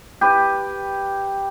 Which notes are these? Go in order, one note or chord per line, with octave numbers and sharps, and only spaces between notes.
G4 B4